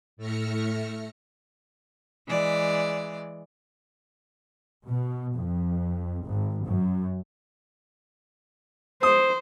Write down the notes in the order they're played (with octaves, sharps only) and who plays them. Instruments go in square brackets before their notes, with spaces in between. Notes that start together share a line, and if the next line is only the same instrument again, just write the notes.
[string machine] A2 A3 E5 F6 A#6 C#7
[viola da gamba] E3 G#3 D5
[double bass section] B2
F2
G#1
F#2
[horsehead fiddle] C5 [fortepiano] D#6